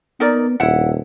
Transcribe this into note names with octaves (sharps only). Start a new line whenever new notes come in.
B3 D#4 A#4 D5
D#1 E4 F#5